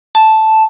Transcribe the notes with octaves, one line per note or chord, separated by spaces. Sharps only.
A5